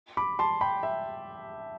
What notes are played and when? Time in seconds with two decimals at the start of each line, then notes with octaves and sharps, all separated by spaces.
0.17 B5 D6
0.39 A5 C6
0.61 G5 B5
0.83 E5 G5